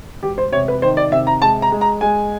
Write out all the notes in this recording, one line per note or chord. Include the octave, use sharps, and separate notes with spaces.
E1 G4
C5
C3 C#5
B4
D#3 C5
D5
C3 E5
A#5
G#3 A5
A#5
G#3
A#5
G#3 G#5